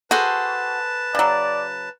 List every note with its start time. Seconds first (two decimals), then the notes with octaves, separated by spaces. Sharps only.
0.11 F#4 G#4 A4 B4 C5 A5
1.15 C#3 F#3 D5